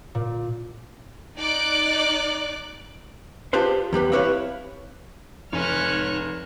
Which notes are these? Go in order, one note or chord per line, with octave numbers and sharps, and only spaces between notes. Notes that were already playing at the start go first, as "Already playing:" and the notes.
A#2
D#4 D5 D6 F#6
D4 F4 G4 G#4 B4 C5
E2 G3 G4 B4
C4 E4 G4 B4 C#5 F5
F1 D#4 C#5 G#5 F6 F#6